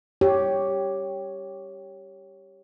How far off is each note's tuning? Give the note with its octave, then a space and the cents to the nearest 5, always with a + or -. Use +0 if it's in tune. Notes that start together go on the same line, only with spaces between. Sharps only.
G4 +0 C#5 +0